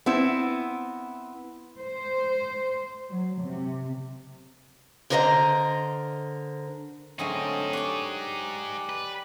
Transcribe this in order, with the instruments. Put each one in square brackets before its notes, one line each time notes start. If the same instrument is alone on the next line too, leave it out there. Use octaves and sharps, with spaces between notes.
[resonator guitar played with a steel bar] B3 C4 E4
[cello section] C5
F#3
C3
[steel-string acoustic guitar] D3 A#4 C5 D#5 E5 A#5
[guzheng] D3 F#3 A3 [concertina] C4 C#4 D#5 [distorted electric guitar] D#4 G#4
[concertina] G4 D5 F#6 [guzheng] C#5 G#5
[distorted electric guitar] B4